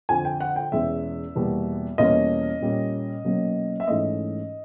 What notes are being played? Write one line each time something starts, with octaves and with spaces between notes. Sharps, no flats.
F2 D3 F3 G#5
G5
F#5
G5
E2 B2 G#3 C#4 E5
E2 B2 G3 A#3
E2 B2 G3 A#3 C#4 D#5
A#2 G3 A#3 C#4
B2 F#3 A#3 C#4
E5
G#2 E3 A3 C#4 D#5